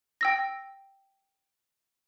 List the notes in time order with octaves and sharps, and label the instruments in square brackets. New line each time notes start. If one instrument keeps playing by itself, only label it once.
[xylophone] G5 E6 A#6